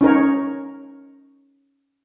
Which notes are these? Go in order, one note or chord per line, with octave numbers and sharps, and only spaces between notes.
C#4 D#4 A#4 C#5